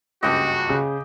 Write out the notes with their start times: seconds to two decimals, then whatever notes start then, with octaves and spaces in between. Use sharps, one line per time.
0.23 F#1 C#2 G2 F#4 D#5 G5 D6
0.69 C#3